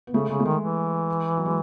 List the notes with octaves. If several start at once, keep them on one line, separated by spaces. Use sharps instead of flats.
B3
C#3 A3
C#3 G#3
A3
D#3 G#3
E3
F#3
G#3